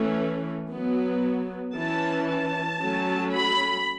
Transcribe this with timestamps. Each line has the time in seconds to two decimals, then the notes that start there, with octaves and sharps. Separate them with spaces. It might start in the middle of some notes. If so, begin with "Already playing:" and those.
Already playing: E3 A3 C#4
0.70 F#3 B3
1.75 E3 C#4 A5
2.28 A5
2.81 F#3 A3 C#4
3.34 B5